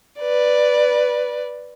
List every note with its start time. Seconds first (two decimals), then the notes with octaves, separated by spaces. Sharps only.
0.20 B4 D5